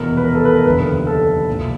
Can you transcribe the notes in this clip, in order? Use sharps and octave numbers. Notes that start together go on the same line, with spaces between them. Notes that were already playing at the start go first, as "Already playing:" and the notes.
Already playing: F1 E2 B2 A#4
B4
A#4
A4
B4
A#4
F1 D#2 D3 B4
A4
C2 A#2 F3